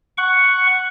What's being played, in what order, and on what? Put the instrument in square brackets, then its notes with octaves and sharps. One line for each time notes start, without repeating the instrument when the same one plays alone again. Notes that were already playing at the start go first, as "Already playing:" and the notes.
[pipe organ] F#5 C#6